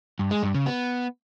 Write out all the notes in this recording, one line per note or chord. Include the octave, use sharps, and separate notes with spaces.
G2
G#3
G2
C#3
B3